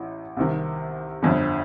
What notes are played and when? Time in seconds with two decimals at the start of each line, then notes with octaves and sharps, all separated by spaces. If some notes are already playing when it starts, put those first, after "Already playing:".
Already playing: A1 A2
0.37 C2 C3 D#3
1.22 G1 F2 D3